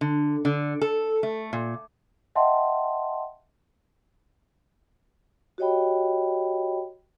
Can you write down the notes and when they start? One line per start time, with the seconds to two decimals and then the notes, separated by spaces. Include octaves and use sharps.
0.01 D3
0.45 D3
0.81 A4
1.23 A3
1.53 A#2
2.35 D#5 E5 F#5 G5 A5 C6
5.58 F#4 G4 C#5 D#5 G5 B5